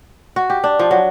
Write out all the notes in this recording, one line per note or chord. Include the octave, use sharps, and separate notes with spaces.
F#4
G4
D4
F3
F#3